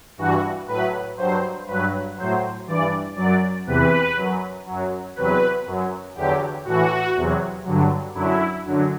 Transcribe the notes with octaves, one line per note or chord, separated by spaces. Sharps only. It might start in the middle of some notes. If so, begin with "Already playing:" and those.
G2 E3 F#4
A2 F#3 B4
G2 F#3 C5
G2 F#3 B4
A2 F#3 C5
G2 E3 D5
F#2 F#3 D5
E2 C3 E3 B4
F#2 F#3
F#2 F#3
E2 C3 F#3 B4
F#2 F#3
E2 D3 F#3 G4
A2 E3 F#4
E2 C3 F#3
G2 D3 F#3
F#2 D3 F#3 E4
F#2 D3 F#3